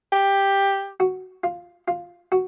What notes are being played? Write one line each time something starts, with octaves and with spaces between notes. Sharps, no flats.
G4
F#4
F4
F4
F#4